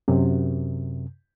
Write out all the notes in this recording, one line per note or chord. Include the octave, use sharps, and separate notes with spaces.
F#2 C3